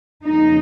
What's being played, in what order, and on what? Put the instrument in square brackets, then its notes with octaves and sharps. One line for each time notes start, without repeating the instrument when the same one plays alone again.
[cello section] F2 C#3 A#3 D#4